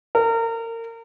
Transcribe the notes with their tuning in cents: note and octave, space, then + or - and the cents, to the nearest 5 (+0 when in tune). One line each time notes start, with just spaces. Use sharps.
A#4 -30